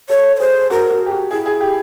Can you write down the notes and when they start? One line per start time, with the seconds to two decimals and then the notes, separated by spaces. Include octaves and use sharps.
0.09 A4 C#5
0.36 C#5
0.39 G#4 C5
0.70 F#4 A#4
0.90 F#4
1.06 G4
1.11 F#4
1.31 E4 G#4
1.46 G#4
1.61 G4